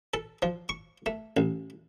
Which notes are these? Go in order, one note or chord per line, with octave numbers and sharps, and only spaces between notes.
A4
F3
C#6
A3
A1